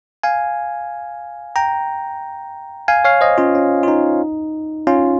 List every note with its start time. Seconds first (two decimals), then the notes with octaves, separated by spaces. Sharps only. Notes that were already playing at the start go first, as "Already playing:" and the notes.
0.23 F5 G#5
1.56 G5 A#5
2.88 F5 G#5
3.05 C#5 F5
3.21 C5 D#5
3.38 C#4 F4
3.55 C#4
3.83 F4
3.88 D#4
4.87 C#4 F4